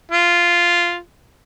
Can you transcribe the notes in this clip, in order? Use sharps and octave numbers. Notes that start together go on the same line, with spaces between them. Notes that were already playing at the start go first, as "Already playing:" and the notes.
F4